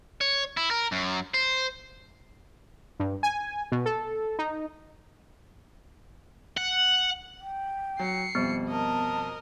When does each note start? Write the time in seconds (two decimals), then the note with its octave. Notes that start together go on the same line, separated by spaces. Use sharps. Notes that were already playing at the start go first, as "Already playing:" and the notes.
0.21 C#5
0.57 E4
0.71 A#4
0.92 F#2
1.34 C5
3.00 G2
3.23 G#5
3.72 B2
3.86 A4
4.39 D#4
6.57 F#5
7.41 G5
7.99 F#3 C7 C#7
8.35 F2 B2 G3 B3
8.69 A#4 D#5 A5